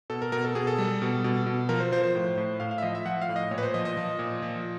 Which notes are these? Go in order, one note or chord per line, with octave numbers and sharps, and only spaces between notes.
B2 A4
A#4
B2 A#4
A4
B2 G#4
A4
G3
B2
B2
B2
F3 A#4
C5
F3 C5
C5
A2
A2
A2 F5
F5
E5
F3 D#5
E5
F3 F#5
F5
A2
D#5
A#2 C#5
B4
C5
F3 D#5
D#5
F3
A#2
F3